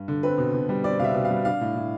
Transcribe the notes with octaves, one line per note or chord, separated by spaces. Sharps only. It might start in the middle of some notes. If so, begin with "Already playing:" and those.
Already playing: G2
D3
C4 B4
B2
B2
G3
C4 D5
B2 E5 F5
B2
F5
G3
D4 F5
A2
A2